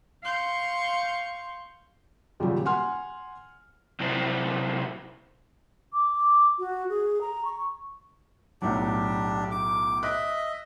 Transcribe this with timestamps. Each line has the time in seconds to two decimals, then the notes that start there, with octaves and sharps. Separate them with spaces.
0.23 F5 C6 C#6 G6
2.40 D#2 A#2 C#3 F#3 G3
2.65 F#5 G#5 C6 F6
4.00 C3 F#3 E4 C5 D5
5.93 D6
6.59 F#4
6.89 G#4
7.21 A#5
7.45 C#6
8.62 B1 A2 F#3 D4 G4
9.51 D6
10.03 D#5 E5 F#6